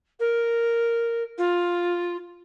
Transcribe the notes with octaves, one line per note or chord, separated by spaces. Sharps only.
A#4
F4